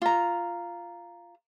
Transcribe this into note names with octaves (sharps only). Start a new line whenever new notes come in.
F4 A#5